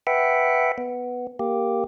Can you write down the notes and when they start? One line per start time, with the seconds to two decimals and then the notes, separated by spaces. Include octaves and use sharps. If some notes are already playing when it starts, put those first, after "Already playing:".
0.07 B4 E5 F#5 G5
0.78 B3
1.39 A#3 G4